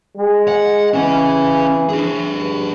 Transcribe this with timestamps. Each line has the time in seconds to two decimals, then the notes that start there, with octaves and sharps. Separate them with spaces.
0.16 G#3
0.48 F#5
0.94 E3 C#4 G#4
1.89 D4 G#4
2.32 G2